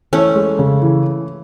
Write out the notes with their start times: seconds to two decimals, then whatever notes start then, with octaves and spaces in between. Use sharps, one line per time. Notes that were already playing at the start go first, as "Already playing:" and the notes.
0.13 E3 A3 C#4
0.35 G#3
0.59 C#3
0.82 E3